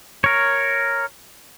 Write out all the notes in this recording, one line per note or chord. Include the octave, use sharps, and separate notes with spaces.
A#4 C#5